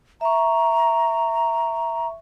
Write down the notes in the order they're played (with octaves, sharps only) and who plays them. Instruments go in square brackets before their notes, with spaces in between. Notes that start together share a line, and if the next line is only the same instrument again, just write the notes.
[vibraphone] E5 C#6 [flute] A#5